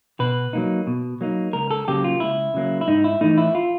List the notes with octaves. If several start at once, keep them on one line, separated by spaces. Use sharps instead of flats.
B2 B4
F#3 A#3 D#4
B2
F#3 A#3 D#4
C#2 A#4
A4
C#3 F#3 A#3 G4
F4
C#2 E4
C#3 F#3 A#3
E4
G#2 D#4
E4
E3 A3 D#4
E4
F4